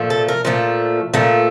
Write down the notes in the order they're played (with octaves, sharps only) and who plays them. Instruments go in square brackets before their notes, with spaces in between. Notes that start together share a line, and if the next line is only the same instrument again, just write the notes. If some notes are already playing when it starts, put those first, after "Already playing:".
Already playing: [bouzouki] A#2 F3 A3
A4
A#4
A#2 F3 A3
A#2 F3 A3